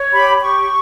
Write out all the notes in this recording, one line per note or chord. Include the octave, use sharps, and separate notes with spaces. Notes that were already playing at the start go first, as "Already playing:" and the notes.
Already playing: C#5
G4 B5
G4 C#6